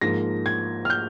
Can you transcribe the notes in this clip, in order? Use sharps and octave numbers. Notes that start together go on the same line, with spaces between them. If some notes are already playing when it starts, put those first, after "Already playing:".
G#2 F3 A#3 A#6
G#6
F6
G6